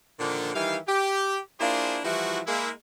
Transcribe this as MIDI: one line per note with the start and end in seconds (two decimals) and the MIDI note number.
0.19 0.53 46
0.19 0.53 50
0.19 0.53 51
0.19 0.53 53
0.19 0.53 58
0.19 0.53 62
0.54 0.77 51
0.54 0.77 52
0.54 0.77 55
0.54 0.77 76
0.54 0.77 77
0.88 1.38 67
1.60 1.98 58
1.60 1.98 62
1.60 1.98 64
1.60 1.98 65
1.60 1.98 68
1.60 1.98 72
2.04 2.41 52
2.04 2.41 53
2.04 2.41 55
2.04 2.41 64
2.04 2.41 66
2.47 2.70 56
2.47 2.70 58
2.47 2.70 64